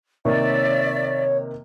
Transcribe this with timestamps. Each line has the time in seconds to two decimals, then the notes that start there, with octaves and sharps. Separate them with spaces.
0.25 C3 D#3 A#3 C#5 D5 E5